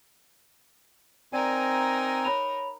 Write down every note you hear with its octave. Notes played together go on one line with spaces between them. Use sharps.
C4 D#4 A#4 D5 G#5
C#5 B5 F7